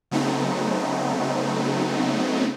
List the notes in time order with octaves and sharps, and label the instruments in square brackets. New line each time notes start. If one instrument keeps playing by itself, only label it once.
[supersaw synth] C#3 F#3 A3 B3 C4 D#4